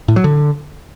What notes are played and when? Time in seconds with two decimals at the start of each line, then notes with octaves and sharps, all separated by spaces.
0.08 A2
0.16 F#3
0.24 D3